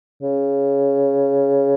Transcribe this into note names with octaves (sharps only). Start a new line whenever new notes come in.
C#3